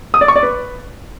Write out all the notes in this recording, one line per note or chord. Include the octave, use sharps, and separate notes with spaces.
D#6
D5
C#6
D5
B4